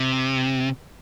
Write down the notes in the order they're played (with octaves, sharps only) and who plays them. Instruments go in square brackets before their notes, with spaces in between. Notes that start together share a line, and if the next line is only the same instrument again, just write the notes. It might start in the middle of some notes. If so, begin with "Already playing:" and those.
Already playing: [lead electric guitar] C3